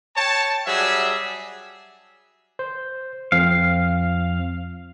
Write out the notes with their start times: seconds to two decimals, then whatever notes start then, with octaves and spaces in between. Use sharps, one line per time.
0.15 C#5 G5 A5
0.66 F#3 G3 D4 G#4 E5
2.59 C5
3.32 F2 F3 C4 F5